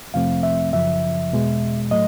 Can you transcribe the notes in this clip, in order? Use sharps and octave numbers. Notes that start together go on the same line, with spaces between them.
F2 C3 F3 A3 C4 F5
E5
F#2 C#3 F3 E5
E2 B2 G#3
A2 F#3 A3 D#5